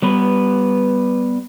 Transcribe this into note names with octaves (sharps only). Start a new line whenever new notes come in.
G3 B3 B4